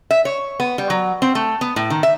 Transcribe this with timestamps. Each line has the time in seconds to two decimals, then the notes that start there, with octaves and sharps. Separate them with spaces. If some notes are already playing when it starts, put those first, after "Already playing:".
0.11 E5
0.25 C#5
0.60 B3
0.78 G3
0.90 F#3
1.22 C4
1.35 A3
1.61 B3
1.76 A2
1.90 D#3
2.03 E5